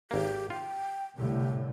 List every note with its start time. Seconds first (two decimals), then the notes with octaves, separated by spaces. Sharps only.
0.11 G#1 A#3 G4
0.50 F4 G5
1.18 C2 A2 D3 G4